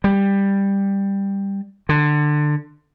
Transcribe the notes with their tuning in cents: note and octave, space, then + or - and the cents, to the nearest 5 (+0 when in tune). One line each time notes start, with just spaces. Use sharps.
G3 +10
D3 +20